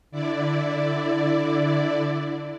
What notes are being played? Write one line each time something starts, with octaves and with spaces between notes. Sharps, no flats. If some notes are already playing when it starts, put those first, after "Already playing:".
D3 E4 D5